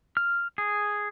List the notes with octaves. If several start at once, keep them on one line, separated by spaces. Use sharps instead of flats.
F6
G#4